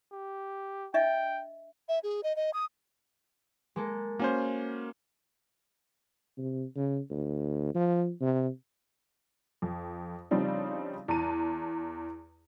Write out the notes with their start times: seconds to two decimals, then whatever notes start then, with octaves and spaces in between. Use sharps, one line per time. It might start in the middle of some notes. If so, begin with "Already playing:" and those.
0.12 G4
0.94 D4 D#5 E5 G5
1.89 E5
2.03 G#4
2.24 D#5
2.36 D#5
2.54 D#6
3.76 G#3 A#3 A4
4.19 A#3 C#4 F#4 C5
6.38 C3
6.76 C#3
7.10 D2
7.75 F3
8.21 C3
9.62 F2
10.31 C#3 F3 G3 C4 D4 D#4
11.08 E2 A5 A#5 D#7